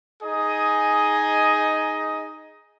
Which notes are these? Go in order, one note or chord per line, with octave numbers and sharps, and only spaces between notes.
D#4 G#4 D#5 G#5 D#6